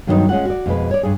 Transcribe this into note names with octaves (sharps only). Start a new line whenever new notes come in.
G2 D#3 F#3 G3 B3 D#4
G#3 C#4 F4 F#5
F#4 D5
F2 B2 G#3 B4
C#5 D5
G2 G#4